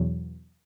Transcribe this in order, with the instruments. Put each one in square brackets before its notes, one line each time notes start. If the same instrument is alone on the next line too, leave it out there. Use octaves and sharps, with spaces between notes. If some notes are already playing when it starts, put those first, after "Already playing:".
Already playing: [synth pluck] E2 B2 F#3